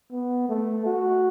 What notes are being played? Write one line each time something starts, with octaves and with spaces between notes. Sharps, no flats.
B3
A3
F#4